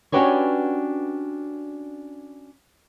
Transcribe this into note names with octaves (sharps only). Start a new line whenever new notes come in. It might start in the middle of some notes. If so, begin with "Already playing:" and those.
C#4 D4 F#4 G4 B4 C#5